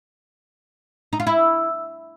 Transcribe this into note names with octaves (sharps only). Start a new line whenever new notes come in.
D#4
F4
E4